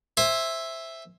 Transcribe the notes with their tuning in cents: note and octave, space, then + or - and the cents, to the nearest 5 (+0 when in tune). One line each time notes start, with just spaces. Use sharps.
C5 +15 E5 +0 G#5 -10